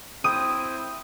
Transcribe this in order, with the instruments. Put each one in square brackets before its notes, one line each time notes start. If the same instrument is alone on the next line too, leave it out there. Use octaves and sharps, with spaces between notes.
[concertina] C4 E4 G5 [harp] D#6